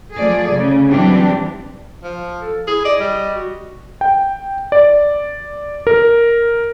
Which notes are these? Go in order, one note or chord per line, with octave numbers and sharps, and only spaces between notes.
F3 A3 G#4 D5
C#3
E3 F#3 G3 C4 D4 G4
F3
A4
E4 G#4
D5 D#5
G3
F#4
G5
D5
A#4